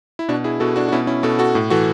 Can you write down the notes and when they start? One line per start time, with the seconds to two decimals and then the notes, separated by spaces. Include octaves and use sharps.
0.19 E4
0.28 B2 D4 F#4
0.44 E4 G#4
0.60 B2 F#4 A4
0.76 D4 F#4
0.89 F#4
0.92 B2 C#4 E4
1.07 C#4 E4
1.23 B2 F#4 A4
1.39 F#4 A4
1.55 A2
1.70 E3 F#4 A4